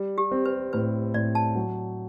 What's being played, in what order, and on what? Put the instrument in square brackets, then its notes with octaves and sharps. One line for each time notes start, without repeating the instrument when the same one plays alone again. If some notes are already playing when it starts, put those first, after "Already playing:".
Already playing: [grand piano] G3
[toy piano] G4
[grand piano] C4
[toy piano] B4
[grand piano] A2 [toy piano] B4
[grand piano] A2 [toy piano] D5
[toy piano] A5
[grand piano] F#3